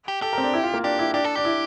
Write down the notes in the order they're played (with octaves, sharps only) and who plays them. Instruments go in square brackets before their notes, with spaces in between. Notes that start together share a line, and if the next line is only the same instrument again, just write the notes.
[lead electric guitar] G4
[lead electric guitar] G4 [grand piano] A4
[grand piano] A#4
C4
D4
E4
F4
A#3
[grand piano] D4 [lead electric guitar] G4
[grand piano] E4
[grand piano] D4 [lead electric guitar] G4
[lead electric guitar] A4
[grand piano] D4 [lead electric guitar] G4
[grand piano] E4